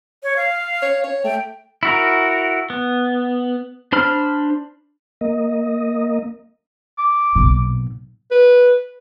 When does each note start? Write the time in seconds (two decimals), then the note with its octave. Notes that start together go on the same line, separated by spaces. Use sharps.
0.23 C#5
0.37 F5
0.82 C#5
1.04 C#5
1.24 A3 G5
1.83 E4 F#4 A#4
2.70 B3
3.92 D4 C5 B5 F6
5.21 A#3 D#5
6.98 D6
7.35 B1 A#2
8.31 B4